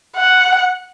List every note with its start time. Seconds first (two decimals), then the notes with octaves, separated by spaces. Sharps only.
0.16 F#5